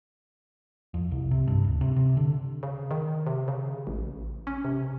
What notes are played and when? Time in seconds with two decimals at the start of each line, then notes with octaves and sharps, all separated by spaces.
0.94 F2
1.11 C2
1.31 C3
1.47 G2
1.64 D1
1.81 C3
1.96 C3
2.17 D3
2.63 C#3
2.91 D#3
3.27 C3
3.48 C#3
3.87 A1
4.47 C#4
4.64 C3